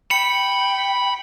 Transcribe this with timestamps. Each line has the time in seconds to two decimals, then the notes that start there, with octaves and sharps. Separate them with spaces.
0.11 G5 B5 C#7